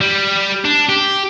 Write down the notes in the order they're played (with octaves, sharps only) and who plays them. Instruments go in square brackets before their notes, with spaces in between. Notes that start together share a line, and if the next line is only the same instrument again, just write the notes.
[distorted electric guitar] G3
D4
G4